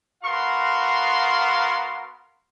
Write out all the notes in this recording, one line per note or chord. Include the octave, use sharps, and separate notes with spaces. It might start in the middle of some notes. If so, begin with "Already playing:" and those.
B3 F#4 A#4 F5 C6